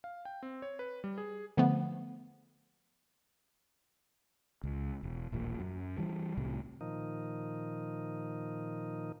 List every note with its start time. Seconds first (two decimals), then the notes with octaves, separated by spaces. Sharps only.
0.04 F5
0.25 G5
0.43 C4
0.62 C#5
0.79 B4
1.04 G3
1.18 G#4
1.57 D3 F3 A3 B3
4.64 C#2
5.03 E1
5.32 D#1 A1 A#2
5.60 F#2
5.98 E3 G3
6.37 C2 A2 C3
6.81 A#2 D#3 F3 D#4